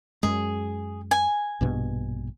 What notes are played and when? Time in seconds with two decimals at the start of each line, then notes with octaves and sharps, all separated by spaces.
0.23 F#2 G#3 G#4
1.11 G#5
1.61 A#1 G2 B2